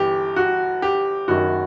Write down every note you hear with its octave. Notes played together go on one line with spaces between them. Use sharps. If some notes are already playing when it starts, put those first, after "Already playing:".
Already playing: G1 E3 G4
F#4
G4
F#1 F#2 D#3 F#4